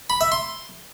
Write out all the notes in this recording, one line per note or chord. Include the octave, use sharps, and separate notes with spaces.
B5
E5
C6